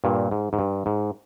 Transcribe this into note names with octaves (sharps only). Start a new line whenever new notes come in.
G2 A#2
G#2
G#2
G2
G#2